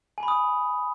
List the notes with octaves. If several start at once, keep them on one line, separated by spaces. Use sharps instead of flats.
G#5
B5
D#6